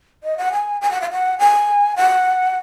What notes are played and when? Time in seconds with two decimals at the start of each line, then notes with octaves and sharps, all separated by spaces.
0.23 D#5
0.38 F#5
0.53 G#5
0.81 G#5
0.91 F#5
1.01 F5
1.11 F#5
1.39 G#5
1.96 F#5